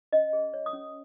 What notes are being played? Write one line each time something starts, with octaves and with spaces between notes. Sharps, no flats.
C#4 D#5
G#4
C#5
D#6
C#4